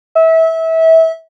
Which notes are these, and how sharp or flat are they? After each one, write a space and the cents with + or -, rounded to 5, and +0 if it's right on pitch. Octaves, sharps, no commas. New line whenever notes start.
E5 -25